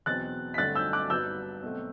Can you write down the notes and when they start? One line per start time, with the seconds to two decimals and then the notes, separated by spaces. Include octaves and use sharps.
0.06 E2 B2 F#3 C4 F#6 A6
0.54 B6
0.58 G2 D3 A3 C4 F#6 A6
0.75 E6 G6
0.93 D6 F#6
1.10 G2 F#3 B3 E6 G6
1.63 B2 F#3 A3 C4